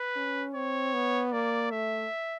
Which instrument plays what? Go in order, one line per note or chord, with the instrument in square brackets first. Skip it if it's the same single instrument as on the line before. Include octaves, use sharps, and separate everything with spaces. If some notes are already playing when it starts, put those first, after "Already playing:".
Already playing: [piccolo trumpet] B4
[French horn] C#4
[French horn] C4 [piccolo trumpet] C#5
[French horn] B3
[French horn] A#3 [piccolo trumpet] D5
[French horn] A3 [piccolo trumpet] E5